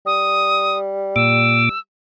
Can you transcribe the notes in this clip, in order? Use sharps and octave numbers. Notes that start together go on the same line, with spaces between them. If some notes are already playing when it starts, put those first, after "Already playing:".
G3 D#6
A#2 D6 E6